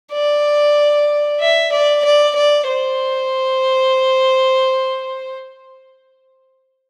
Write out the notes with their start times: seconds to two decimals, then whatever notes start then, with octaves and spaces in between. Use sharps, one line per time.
0.12 D5
1.40 E5
1.72 D5
2.05 D5
2.35 D5
2.68 C5